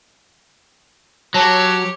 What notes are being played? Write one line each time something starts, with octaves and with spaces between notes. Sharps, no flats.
F#3 G4 C#5 A5